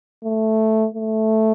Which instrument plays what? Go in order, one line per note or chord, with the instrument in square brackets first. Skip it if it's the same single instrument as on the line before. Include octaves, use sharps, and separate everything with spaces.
[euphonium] A3
A3